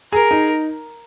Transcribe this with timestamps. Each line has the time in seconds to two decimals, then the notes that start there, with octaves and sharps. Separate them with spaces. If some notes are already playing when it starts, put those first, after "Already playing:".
0.13 G#4 A#4
0.31 D#4